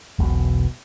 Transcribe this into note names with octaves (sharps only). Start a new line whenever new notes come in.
E1 B1 B2